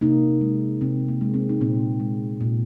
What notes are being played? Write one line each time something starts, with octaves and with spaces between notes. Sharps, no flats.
C3 A#3 D#4
G#3
C3 C4
A#3
G#3
C4
D#4
A#2 C4
G#3
A#2